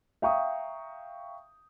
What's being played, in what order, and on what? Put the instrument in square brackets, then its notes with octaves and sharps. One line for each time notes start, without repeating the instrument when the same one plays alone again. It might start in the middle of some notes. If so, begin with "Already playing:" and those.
[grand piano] E5 F5 G5 A#5 C#6 D#6